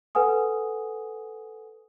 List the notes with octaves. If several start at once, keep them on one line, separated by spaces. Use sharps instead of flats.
A4 B4 F#5 G#5 D#6